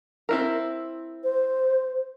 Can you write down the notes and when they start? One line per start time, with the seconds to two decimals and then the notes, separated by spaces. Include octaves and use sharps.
0.29 C4 E4 A#4
1.23 C5